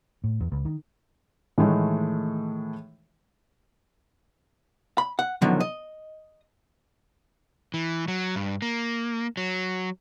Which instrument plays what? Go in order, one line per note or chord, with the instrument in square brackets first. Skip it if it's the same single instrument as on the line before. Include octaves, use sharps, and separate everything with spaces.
[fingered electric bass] A2
E2
C#2
D#3
[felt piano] A2 D#3 E3 G#3 A3
[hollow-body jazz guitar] B5
F#5
F#2 B2 D3 D#3 F3 F#3
D#5
[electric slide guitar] E3
F#3
G2
A#3
F#3